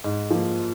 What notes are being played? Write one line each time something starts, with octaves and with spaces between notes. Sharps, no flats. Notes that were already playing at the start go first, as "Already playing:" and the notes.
G#2
F3 A#3